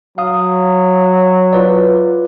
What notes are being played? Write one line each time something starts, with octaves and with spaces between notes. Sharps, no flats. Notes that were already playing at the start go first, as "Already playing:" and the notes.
F#3 F5 D#6
F4 B4 D5